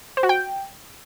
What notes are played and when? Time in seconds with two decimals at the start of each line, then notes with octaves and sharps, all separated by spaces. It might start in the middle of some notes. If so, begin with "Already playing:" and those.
0.17 C5
0.23 F#4
0.29 G5